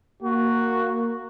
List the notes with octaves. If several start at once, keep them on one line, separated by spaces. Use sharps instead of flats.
A#3 F#4